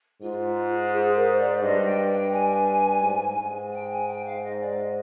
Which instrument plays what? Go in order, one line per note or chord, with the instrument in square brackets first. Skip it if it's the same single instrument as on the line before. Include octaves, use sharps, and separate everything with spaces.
[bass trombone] G#2 [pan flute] F4
[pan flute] G#4
A#4
C5
D5
[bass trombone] G2 [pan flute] D#5
[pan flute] G5
G5
G#5
[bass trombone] G#2
G#2
[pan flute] G5
G#5
G5
F5
D#5
D5
D#5